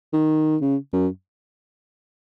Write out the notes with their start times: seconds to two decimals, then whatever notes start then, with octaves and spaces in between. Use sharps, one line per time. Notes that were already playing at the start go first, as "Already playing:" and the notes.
0.13 D#3
0.62 C#3
0.93 F#2